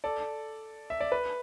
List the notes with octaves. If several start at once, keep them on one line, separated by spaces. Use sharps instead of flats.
A4 D5
E5
D5
B4